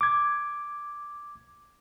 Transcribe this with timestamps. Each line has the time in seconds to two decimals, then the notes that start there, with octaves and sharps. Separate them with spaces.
0.01 D6 G#6